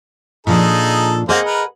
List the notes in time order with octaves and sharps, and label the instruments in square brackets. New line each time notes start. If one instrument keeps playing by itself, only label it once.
[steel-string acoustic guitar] A#2 F3 D4 [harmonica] D#4 G#4 A4
[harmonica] A#3 C4 C5 [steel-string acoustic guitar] G#4 D#5 F#5
[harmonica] A#4 B4